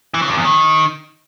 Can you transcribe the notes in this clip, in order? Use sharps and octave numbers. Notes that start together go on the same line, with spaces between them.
E3
C#3
G2
E2
D#3